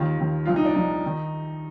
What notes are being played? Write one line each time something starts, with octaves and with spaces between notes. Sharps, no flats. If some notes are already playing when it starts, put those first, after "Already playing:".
Already playing: D#2 D#3 F4
D#2 D#3
C2 A#2 F3 F4
D#4
D4
C2 A#2 F3 D#4
D#3